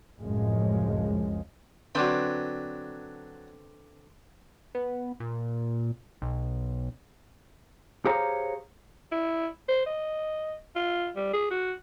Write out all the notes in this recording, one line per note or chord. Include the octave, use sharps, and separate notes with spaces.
F1 C#2 F#2 A2 F3 G#3
D3 F#3 C4 D4 B4 B5
B3
A#2
B1
G4 G#4 C5 C#5 F5 A#5
E4
C5
D#5
F4
G3
G#4
F#4